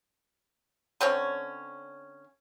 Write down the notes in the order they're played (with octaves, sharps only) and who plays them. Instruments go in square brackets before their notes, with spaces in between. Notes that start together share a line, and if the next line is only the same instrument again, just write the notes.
[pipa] D3 C4 C#4 C#5